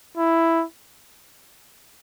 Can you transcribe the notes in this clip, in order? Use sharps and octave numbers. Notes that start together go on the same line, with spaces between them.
E4